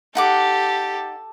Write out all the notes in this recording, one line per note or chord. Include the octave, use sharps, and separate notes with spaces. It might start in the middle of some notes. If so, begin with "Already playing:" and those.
D#4 G4 A4 F#5 D6